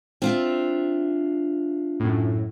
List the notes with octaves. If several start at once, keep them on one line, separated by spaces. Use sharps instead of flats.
C4 D4 F4 E5
F#2 A2